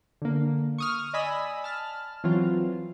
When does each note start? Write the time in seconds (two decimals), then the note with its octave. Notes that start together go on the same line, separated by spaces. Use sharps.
0.22 D3 A#3
0.78 C#6 D#6 F6
1.13 D5 D#5 G#5 B5 D#6 E6
1.64 A5 F6
2.24 E3 F#3 C4 F4